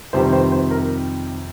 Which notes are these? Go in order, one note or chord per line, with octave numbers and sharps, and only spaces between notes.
F2 C3 D#3 G3 C5
C5
C5
A#4